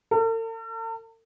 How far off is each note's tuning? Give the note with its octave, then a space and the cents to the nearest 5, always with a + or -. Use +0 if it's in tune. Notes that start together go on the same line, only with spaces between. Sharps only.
A4 +45